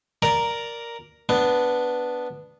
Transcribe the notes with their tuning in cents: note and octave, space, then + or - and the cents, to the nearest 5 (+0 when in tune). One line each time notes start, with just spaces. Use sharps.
A#4 +0 D5 +0 A#5 +0
B3 +0 D4 +0